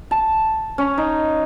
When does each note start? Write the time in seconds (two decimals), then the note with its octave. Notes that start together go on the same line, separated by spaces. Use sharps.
0.11 A5
0.78 C#4
0.98 D#4